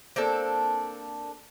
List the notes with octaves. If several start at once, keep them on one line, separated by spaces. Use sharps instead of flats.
A#3 C4 D4 A4